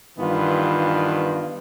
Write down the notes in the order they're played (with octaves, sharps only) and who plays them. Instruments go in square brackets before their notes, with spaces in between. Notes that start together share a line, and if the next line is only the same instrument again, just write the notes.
[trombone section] G2 D#3 E3 B3 F4